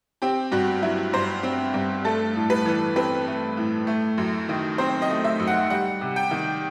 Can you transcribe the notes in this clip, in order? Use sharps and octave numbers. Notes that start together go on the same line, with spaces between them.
C4 G4
G2 F#4
F#3 E4
G2 C5
C4
G2
A3 A4
A2
B4
E3
C4 B4
A3
A2
A3
F#2
D#3
C4 C5
D#5
A3
E5
F#2
F#5
G3 F#5
C3
G5
D#3